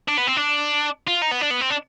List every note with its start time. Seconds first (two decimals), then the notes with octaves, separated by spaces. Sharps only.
0.08 D4
0.17 B3
0.27 C4
0.36 D4
1.08 F4
1.22 D#4
1.32 B3
1.41 D4
1.51 B3
1.61 C4
1.70 D4